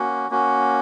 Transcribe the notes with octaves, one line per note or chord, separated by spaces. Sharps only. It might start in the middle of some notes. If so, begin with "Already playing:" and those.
Already playing: A#3 C#4 F#4
A#3 C#4 F#4